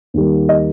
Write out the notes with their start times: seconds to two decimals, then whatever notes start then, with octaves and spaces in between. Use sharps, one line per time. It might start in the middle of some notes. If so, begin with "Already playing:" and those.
0.14 D#2 D#3 G3 A#3
0.49 D#5